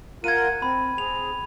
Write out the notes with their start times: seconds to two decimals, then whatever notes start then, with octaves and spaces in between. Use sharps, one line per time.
0.24 F4 A#4 F#5 G#6 D#7
0.62 C4 B5
0.98 C4 G#4 F7